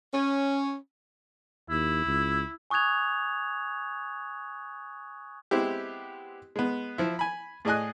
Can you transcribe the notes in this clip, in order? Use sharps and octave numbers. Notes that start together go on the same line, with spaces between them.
C#4
D#2 E4
C#2
G#5 C#6 D#6 F#6 G#6 F7
G#3 B3 C4 E4 G4
G#3 B3
F3 E4
G#5 B5
A2 G#4 D5 D#5 G#5 F#6